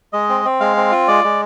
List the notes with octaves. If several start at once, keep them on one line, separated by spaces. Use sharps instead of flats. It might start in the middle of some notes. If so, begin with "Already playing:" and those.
G#3 D#5
C4
C4
G#3 F5
C4
F4
G#3 D5
G#3